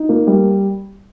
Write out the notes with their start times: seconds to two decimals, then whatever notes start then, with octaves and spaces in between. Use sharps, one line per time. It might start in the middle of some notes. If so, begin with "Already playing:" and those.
Already playing: D#4
0.09 A#3
0.27 G3